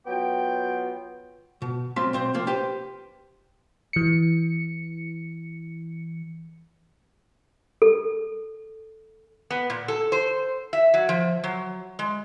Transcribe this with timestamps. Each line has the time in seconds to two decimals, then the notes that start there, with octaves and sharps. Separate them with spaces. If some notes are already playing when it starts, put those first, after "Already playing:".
0.07 F#3 B3 F4 G5
1.62 B2
1.96 F#3 C4 F4 B5 C6
2.13 B1 C4 C5
2.34 C3 F3 A#3
2.47 G4 B4 C5 G5
3.93 E3 C#7
7.82 A4
9.50 B3
9.70 A#2
9.88 A4
10.12 C5
10.73 E5
10.94 F#3
11.09 F3
11.44 F#3
11.99 G#3